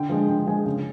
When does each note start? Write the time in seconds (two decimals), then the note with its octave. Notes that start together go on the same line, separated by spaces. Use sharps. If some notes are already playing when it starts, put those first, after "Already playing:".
Already playing: D3 G5
0.09 F3 G#3
0.29 D3 G5
0.47 F3 G#3 G#5
0.66 C#3